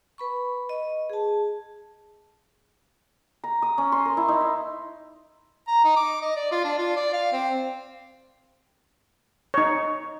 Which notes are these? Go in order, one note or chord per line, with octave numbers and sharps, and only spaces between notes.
B4 B5 C#6
D#5
G#4 A5
A#5
D#6
C#4
C6
A#4
E4
D#4
E5
A#5
D#4
D6
D#5
D5
F4
D4
F4
D5
F5
C4
D#4 C#5